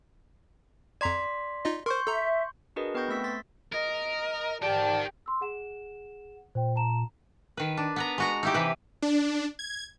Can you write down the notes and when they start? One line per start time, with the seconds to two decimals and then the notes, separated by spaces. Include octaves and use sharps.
1.01 F2 D5 A#5 C6 G#6 B6
1.65 D#4 F4 D#5
1.86 A#4 C5 C6 C#6 G6
2.07 A4 E5 A#5
2.76 D4 F#4 G#4 A#4 B4 D#5
2.94 B3 B4 G5 C#6 G6 A#6
3.08 A3 C4 E6 B6
3.24 C6 A6 B6
3.73 A#4 D#5
4.62 G#2 G4 A#4 D5 G5 A5
5.26 C6 E6
5.41 G#4 F#5 E7
6.55 A#2 C5 G5
6.76 A5 A#5 E7
7.57 D#3 B4
7.77 D4
7.96 B3 B4 A#5
8.18 G#3 F#4 A#5
8.43 D#4 E4 G4
8.54 C3 E3 B4
9.02 D4
9.59 G#6